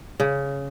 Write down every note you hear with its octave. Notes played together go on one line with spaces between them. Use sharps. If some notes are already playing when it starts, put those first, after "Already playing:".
C#3